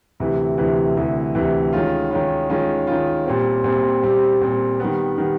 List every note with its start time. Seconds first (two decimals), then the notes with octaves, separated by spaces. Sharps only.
0.20 D2 C3 E3
0.58 D2 C3 E3
0.97 D2 C3 E3
1.35 D2 C3 E3
1.73 D#3 G#3 C#4 F4
2.11 D#3 G#3 C#4 F4
2.50 D#3 G#3 C#4 F4
2.87 D#3 G#3 C#4 F4
3.26 A#2 G3 C4
3.64 A#2 G3 C4
4.03 A#2 G3 C4
4.41 A#2 G3 C4
4.80 D#3 G3 B3
5.18 D#3 G3 B3